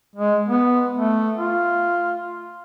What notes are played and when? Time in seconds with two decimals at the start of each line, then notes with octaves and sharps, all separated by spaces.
0.16 G#3
0.49 B3
0.96 A3
1.37 F4